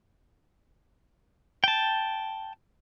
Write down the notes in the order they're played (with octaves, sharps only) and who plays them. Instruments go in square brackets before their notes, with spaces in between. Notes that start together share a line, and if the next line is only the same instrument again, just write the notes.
[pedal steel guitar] G5 A5